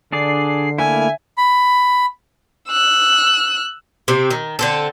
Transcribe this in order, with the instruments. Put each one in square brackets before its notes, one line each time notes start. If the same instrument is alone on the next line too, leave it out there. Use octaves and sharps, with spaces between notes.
[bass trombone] D3 [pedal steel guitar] D4 G#4 D5 [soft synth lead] C7
[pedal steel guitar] A3 A#3 E4 [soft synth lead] E5 [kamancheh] G#5
[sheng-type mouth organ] B5
[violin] E6 F#6
[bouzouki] C3 C4
D#3
D3 C4 A4